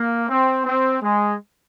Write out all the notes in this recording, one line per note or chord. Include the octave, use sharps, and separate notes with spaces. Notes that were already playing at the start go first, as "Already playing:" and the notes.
Already playing: A#3
C4
C4
G#3